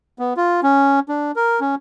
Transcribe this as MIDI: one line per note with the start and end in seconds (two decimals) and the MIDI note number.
0.19 0.34 59
0.37 0.60 65
0.63 1.00 61
1.09 1.32 62
1.36 1.60 70
1.61 1.75 61